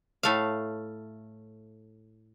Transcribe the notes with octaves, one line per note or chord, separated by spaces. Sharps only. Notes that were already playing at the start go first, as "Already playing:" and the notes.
A2 A3 F5